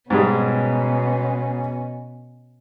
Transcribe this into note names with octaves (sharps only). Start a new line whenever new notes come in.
G#2 B2 G3 B3 C#4 G#4